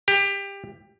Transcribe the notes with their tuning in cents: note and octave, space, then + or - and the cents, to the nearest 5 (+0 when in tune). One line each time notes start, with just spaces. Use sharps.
G4 +20